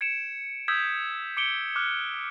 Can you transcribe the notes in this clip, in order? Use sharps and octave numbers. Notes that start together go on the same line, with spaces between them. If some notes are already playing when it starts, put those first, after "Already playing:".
G#6 C#7 D7 E7
D#6 E6 G6 G#6 B6 E7
D6 C#7 D7 G7
D6 F6 F#6